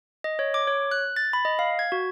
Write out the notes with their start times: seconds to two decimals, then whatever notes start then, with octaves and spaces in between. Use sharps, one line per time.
0.24 D#5
0.39 C#5
0.54 D6
0.67 C#5
0.91 F#6
1.16 A6
1.33 B5
1.45 D#5
1.59 F5
1.79 G#6
1.92 F#4